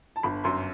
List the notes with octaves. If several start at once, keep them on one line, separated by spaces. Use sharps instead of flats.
A5
G1 B5
F#2 C6